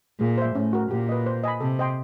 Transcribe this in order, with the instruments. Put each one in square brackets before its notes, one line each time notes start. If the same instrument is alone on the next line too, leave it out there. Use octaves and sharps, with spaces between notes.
[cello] A#2 [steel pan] G#4
[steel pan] C5 E5
[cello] A2 [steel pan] C#4
[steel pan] F#4 A#4
[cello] A#2 [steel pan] G4
[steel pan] B4 D#5
C5
D#5 G#5 B5
[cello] C3 [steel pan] A4
[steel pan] C5 D#5 G5 C6